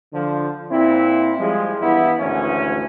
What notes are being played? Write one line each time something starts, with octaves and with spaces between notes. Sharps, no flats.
D3 F3
A#2 C4 E4
F3 G3 G#3
G2 E3 B3 E4
G#1 D2 E3 C#4